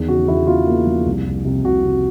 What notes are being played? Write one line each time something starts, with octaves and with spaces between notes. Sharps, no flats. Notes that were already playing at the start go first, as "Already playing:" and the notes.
Already playing: E2 D#3
C#3 F#4
E2 E4
E2 F4
A#3
F3
C2
C2
C3
C2 F#4
C3